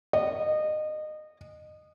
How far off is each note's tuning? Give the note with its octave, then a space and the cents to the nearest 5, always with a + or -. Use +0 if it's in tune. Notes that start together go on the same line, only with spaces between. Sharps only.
D#5 -25